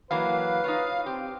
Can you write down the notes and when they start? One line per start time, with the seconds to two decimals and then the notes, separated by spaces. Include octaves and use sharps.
0.11 E3 F#3 A#3 B4 F5
0.64 D#4 F4 C#5
1.06 C4 G4